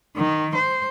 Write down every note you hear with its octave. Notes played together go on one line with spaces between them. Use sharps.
D#3
C5